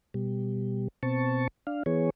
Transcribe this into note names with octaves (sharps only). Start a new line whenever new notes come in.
B2 G3
B2 C4 A5 C#6
D4 F5
E3 B3 G#4 C#5